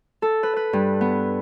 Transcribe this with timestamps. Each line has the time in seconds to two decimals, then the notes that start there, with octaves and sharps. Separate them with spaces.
0.22 A4
0.43 B4
0.56 B4
0.73 G2
1.01 B3